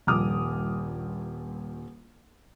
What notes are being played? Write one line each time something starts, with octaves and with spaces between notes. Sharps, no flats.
D#1 A#1 G2 D6 D#6 F6